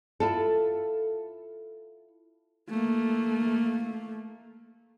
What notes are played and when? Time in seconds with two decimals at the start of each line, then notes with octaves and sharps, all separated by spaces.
0.20 E4 F4 A4
2.69 A3 A#3